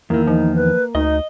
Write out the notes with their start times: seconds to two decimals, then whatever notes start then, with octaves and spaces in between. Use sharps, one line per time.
0.10 E2 D#3 A#3 E4
0.27 F3 D#4
0.56 B4
0.95 D2 D#4 D#5